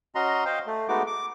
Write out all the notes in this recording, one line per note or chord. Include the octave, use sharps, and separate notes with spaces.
C#4 F#4 D#5 A#5 C6
C5 D#5 F5 G5
A3
G#3 A3 B3 D#4 F#4 D6
D6